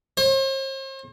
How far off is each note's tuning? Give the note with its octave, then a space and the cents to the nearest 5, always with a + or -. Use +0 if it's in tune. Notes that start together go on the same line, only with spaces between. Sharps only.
C5 +45